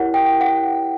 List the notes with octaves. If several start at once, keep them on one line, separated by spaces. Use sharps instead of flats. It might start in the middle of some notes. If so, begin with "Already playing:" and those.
Already playing: E4 G4 A#4 C#5 F#5
G5
F#5